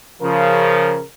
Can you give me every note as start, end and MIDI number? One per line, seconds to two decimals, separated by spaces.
0.22 1.00 49
0.22 1.00 53
0.22 1.04 70